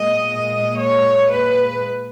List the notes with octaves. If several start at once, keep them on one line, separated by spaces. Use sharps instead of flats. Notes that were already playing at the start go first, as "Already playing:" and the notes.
Already playing: A#2 G#3 D#5
C#5
B4